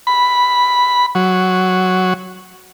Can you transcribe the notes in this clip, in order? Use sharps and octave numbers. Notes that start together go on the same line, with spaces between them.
B5
F#3